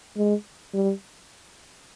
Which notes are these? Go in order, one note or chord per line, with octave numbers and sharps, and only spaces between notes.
G#3
G3